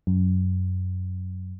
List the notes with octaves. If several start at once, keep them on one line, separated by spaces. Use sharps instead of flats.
F#2